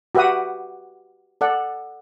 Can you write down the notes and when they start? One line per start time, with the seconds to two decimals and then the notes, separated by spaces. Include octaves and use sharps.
0.15 F#4 G4 B4 E5 F#5 D#6
1.41 A4 D5 F#5